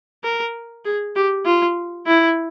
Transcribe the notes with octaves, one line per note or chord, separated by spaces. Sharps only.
A#4
G#4
G4
F4
E4